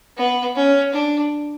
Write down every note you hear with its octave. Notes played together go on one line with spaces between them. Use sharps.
B3
C#4
D4